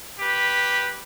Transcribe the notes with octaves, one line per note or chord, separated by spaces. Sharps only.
G4 B4